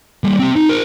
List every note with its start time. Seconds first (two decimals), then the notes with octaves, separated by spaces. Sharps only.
0.24 G3 A#3
0.39 C4 G4
0.56 D#4
0.69 A#4 C5